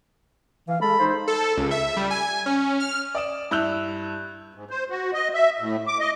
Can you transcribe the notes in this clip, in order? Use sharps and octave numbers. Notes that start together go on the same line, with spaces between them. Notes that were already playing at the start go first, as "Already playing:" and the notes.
E3 F5
G#3 A4 B5
D#4 C5
A4
C#2
E5
G3
G#5
C#4
F6
D5 D#6 E7
G2 E4 E6 F#6 G6 F7
G#2
C5
F#4
D#5
E5
A2
D6
D#5